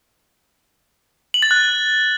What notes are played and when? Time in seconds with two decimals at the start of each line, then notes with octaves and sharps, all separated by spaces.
1.34 F#7
1.42 A6
1.51 F#6